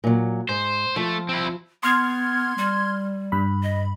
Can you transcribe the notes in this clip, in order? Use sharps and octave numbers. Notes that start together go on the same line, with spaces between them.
A#2 F#3
G#2 C5
F3 A3
C4 E4
B3 C6 F6 G#6
G3
G2 B5
D#5